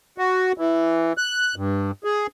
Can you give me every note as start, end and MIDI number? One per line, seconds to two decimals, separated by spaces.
0.18 0.52 66
0.58 1.13 52
1.18 1.55 90
1.56 1.91 43
2.04 2.27 68